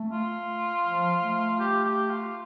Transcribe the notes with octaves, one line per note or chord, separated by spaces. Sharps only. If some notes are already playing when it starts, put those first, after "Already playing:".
Already playing: A3
F4
F3
A3
G4
G4
F4